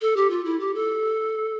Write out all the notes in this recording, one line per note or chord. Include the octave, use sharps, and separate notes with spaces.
A4
G4
F4
E4
G4
A4